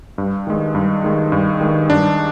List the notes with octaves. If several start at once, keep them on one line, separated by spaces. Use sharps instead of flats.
G2
D#3 G#3
G2
D#3 G#3
G2
D#3 G#3
G2 D4